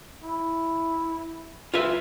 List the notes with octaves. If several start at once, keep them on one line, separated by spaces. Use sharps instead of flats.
E4
F4 B4 E5